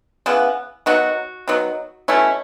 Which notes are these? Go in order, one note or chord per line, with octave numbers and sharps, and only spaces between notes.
C#3 E3 B3
D#3 F#3 B3 F#4
D#3 F#3 B3
B2 A3 C#4 E4